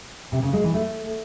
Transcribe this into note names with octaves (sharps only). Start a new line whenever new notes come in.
C3
C#3
G#3
E3
A3